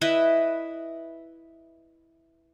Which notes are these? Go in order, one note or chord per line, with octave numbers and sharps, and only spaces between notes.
E4 B4 D#5 E5